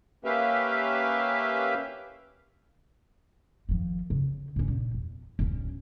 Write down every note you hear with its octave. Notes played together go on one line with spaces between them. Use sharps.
A#3 C#4 G4 B4 E5 F5
D#3 F3
C#3
G2 C#4
A#2
E2
D1 C#4